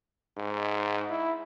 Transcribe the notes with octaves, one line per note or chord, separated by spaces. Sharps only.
G#2
E4